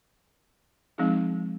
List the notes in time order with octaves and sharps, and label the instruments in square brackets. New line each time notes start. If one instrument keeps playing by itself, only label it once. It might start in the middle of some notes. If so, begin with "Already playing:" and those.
[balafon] F3 G#3 C4 D#4 G#4